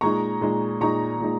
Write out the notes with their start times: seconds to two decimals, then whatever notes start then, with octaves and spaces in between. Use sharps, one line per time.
0.01 A#2 G#3 D#4 A#5 C#6
0.41 A#2 G#3 D#4
0.81 A#2 G#3 D#4 A#5 C#6
1.20 A#2 G#3 D#4